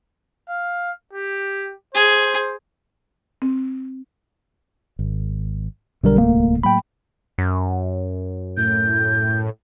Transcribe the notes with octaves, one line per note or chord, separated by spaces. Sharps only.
F5
G4
G#4 C5
C4
G#1
B1 D3 G3 A#4
D1 C2 A3 A#3
A2 F#3 A#3 G5 B5
F#2
A2 G6